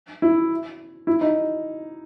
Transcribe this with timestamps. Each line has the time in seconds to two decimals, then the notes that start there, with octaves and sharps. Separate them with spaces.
0.22 E4
1.07 E4
1.21 D#4